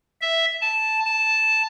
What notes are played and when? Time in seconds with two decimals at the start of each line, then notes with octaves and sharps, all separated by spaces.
0.21 E5
0.61 A5
1.05 A5